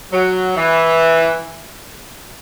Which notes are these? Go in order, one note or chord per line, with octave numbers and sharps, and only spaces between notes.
F#3
E3